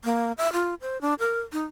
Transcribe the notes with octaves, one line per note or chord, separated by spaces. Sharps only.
A#3
E5
F4
C5
D4
A#4
D#4